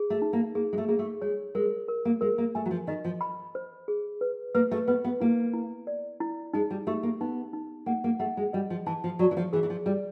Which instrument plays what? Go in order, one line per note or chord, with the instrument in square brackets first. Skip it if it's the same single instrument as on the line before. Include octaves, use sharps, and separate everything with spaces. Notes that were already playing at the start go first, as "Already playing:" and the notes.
Already playing: [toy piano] G#4
[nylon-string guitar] A3
[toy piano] D#4
[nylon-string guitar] A#3
[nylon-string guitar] A#3 [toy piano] G#4
[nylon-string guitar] G#3
A3
[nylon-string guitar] A#3 [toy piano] G#4
[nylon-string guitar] A3
[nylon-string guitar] G#3 [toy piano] C#5
[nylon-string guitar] G#3 [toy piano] A#4
[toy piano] A#4
[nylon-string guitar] A#3
[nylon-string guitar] G#3 [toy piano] A#4
[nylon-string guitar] A#3
[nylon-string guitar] A3 [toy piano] G#5
[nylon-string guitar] F#3
F3
[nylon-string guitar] D#3 [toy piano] D#5
[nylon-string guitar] F3
[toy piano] B5
C5
G#4
B4
[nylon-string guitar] A#3 [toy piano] B4
[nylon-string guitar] A3
[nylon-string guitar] B3 [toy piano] B4
[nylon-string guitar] B3
[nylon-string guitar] A#3 [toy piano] E4
[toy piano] E4
D5
E4
[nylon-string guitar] G#3 [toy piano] D#4
[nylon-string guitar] G3
[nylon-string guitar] A3 [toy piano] G4
[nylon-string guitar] A#3
[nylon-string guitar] B3 [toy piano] D#4
[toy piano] D#4
[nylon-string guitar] A#3 [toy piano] F#5
[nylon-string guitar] A#3
[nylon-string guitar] A3 [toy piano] F#5
[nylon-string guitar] G#3
[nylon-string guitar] G3 [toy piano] D#5
[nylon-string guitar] F3
[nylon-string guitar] E3 [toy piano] A5
[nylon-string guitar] F3
[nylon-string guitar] F#3 [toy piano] D5
[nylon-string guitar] E3
F3
[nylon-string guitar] E3 [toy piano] G#4
[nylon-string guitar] E3
F3
[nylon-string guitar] G3 [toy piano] D5